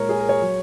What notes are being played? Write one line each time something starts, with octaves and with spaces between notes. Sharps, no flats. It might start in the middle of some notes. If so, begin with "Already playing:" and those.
Already playing: A#2 G#3 A#4 C#5
G#4
A#4
C#5
F#3